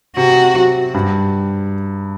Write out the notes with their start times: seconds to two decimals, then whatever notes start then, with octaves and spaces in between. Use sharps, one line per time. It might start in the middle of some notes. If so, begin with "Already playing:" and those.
0.17 C3 F#4
0.56 F#3
0.94 G2